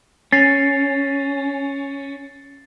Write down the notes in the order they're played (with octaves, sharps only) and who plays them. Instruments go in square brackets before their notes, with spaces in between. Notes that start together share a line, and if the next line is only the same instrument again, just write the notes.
[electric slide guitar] C#4 [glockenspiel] A6 C7